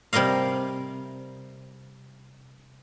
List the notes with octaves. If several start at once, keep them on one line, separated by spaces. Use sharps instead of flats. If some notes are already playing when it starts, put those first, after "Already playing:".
C3 G3 A#4 D#5 F5